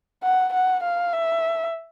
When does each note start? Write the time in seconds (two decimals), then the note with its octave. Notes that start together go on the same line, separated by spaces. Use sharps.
0.23 F#5
0.53 F#5
0.83 F5
1.13 E5